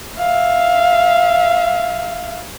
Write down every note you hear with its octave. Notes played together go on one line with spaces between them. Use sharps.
E5 F5